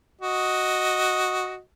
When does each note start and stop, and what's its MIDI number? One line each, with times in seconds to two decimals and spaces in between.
0.21 1.59 66
0.21 1.59 75